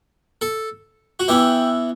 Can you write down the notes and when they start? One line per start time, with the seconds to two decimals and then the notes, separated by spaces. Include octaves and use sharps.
0.41 A4
1.20 F#4
1.28 E3 B3 E4 G4